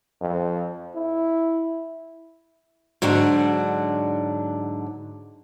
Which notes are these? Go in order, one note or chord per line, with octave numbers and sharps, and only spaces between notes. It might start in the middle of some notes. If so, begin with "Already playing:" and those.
F2
E4
G#2 D3 F#3 D4